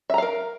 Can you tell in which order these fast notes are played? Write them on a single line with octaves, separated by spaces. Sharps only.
E5 A#5 F5 A#4